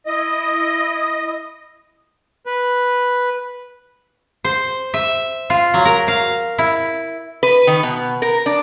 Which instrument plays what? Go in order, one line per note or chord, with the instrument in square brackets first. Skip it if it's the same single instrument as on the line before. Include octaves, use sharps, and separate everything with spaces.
[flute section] E4 D#6 [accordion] D#5
[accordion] B4
[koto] C5
E5
F4
F#3
A#4
F5
E4
[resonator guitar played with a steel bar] B4
D#3
B2
A#4
D4